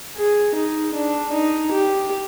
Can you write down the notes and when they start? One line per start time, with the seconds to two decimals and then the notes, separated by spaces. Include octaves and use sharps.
0.16 G#4
0.54 D#4
0.94 D4
1.32 D#4
1.71 G4